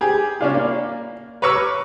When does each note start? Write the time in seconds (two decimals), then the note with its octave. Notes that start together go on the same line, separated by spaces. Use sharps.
0.01 G4 G#4
0.41 G3 C#4 D4 F4
0.54 A#3
1.42 B4 C#5 A#5 C#6 D6 E6